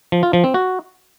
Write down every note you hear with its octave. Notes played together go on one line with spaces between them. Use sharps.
F3
F4
F3
C4
F#4